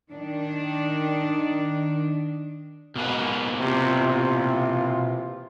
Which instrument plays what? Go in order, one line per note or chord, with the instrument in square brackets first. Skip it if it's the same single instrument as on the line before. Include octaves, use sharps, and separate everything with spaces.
[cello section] D#3 D4
[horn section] G#2 [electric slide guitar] B2 A#3 B4
[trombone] C3 [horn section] E3 F4
[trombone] C3